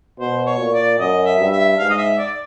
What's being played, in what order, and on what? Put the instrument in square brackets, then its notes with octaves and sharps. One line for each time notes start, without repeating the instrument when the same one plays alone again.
[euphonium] B2 [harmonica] C5
[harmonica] C#5
[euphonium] A#2
[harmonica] D5
[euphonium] F#2 [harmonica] D#5
[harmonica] E5
[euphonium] G2
[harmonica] E5
[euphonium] G#2 [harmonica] F5
[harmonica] D#5
E5
D5